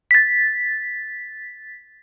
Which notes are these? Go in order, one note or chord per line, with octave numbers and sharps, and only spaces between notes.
A6 B6